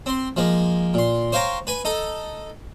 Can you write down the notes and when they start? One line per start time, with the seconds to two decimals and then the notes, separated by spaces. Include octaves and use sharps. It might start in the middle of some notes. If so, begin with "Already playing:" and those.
0.06 C4 C6
0.37 F3 G#3 A#3
0.94 A#2 C6
1.32 C5 C#5 F5 G5 A#5
1.67 B4 G#5 B5
1.85 D#4 A4